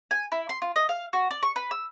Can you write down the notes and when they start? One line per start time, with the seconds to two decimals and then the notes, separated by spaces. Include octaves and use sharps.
0.11 G#5
0.32 E4
0.49 C6
0.62 F4
0.76 D#5
0.89 F5
1.13 F#4
1.31 D5
1.43 C#6
1.56 B4
1.71 E6